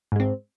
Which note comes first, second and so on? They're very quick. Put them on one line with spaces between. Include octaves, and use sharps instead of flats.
G#2 G#3 C4